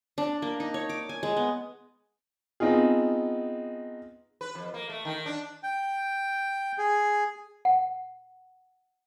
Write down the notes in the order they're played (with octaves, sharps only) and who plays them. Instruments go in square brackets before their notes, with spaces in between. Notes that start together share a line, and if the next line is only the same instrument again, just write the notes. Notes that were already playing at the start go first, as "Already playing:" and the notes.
[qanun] D4
A#3
D#4
C#5
D6
G#5
G#3
B3
[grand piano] B3 C4 D#4 F4 G#4
[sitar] B4
F2
A#3
A3
D#3
D4
[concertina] G5
G#4
[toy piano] F#5